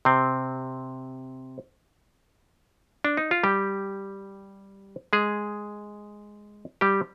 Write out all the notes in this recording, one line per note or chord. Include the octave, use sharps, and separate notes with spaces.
C3 C4
D4
D#4
F4
G3 G4
G#3 G#4
G3 G4